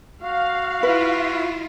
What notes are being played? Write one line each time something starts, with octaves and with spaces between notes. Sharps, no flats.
F#4 F5
E4 F4 B4